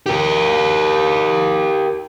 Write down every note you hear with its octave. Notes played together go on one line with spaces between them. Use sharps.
G4 A#4